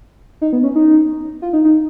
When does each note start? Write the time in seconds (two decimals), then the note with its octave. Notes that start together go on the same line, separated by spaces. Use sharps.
0.41 D#4
0.53 B3
0.64 C#4
0.76 D#4
1.42 F4
1.53 D#4
1.64 D#4